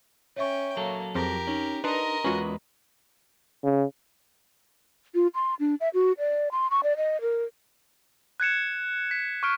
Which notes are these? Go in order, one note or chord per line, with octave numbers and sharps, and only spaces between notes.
C#4 C#5 E5 G5 C#6
F#3 A#3 A4
F2 F3 G4 G#4 A#4 A#6
C#4 D#4
D4 D#4 A#4 B4 D#5 C6
E2 G#3 C#4 F4 F#4 B4 C#6
C#3
F4
C6
D4
E5
F#4
D5
C6
C#6
D5
D#5
A#4
F#6 G#6 C#7 E7
B6
C#6 F6 D7